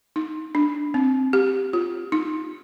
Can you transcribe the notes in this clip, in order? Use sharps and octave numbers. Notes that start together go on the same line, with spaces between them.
D#4
D4
C4
G4
F4
D#4